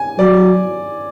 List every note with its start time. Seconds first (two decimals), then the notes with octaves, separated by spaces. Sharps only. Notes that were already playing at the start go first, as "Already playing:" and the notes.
Already playing: G#5
0.19 F#3 D5